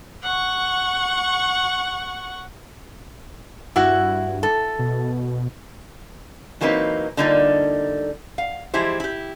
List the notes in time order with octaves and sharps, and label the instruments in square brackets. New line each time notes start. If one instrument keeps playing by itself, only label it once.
[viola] F#5 C#6
[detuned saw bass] G2 [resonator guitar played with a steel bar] E4 F#4
[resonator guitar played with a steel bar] A4
[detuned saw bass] B2
[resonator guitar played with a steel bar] E3 F#3 A#3 C4 D#4 B4
D3 G3 A#3 D#4 F4 A4
F5
E3 F3 G#3 E4 G4 C5
E4 G4